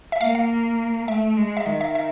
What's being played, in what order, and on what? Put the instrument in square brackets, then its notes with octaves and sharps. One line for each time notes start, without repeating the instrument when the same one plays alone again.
[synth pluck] E5
[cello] A#3 [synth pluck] F5
[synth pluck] F5
[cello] A3 [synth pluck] E5
[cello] G#3
[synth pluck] E5
[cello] D#3 [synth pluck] D#5
[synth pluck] E5
E5